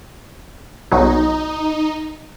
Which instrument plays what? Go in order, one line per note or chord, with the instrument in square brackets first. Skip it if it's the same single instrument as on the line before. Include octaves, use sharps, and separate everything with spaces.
[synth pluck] B1 B2 F#3 [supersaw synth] D#4